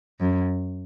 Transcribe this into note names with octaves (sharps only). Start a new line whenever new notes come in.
F#2